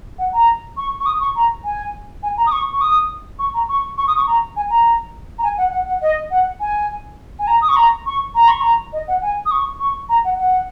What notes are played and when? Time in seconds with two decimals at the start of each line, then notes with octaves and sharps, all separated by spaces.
0.19 F#5
0.33 A#5
0.77 C#6
1.00 C#6
1.06 D#6
1.21 C#6
1.36 A#5
1.64 G#5
2.23 G#5
2.38 A#5
2.46 D#6
2.52 C#6
2.73 C#6
2.81 D#6
3.39 C#6
3.54 A#5
3.69 C#6
3.98 C#6
4.08 D#6
4.18 C#6
4.27 A#5
4.56 G#5
4.70 A#5
5.39 A#5
5.44 G#5
5.58 F#5
5.72 F#5
5.87 F#5
6.02 D#5
6.31 F#5
6.60 G#5
7.39 G#5
7.47 A#5
7.62 D#6
7.69 C#6
7.76 A#5
8.06 C#6
8.35 A#5
8.48 C#6
8.61 A#5
8.93 D#5
9.08 F#5
9.22 G#5
9.46 D#6
9.51 C#6
9.80 C#6
10.09 A#5
10.25 F#5
10.39 F#5